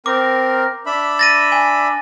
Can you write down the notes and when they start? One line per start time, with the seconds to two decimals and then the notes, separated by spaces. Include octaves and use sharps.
0.06 C4 A#4 D6
0.86 D4 E5 B5
1.19 A6 A#6 D#7
1.52 G#5